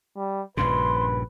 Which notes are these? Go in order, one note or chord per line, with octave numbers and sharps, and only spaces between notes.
G3
A#1 G2 C#3 B4 C6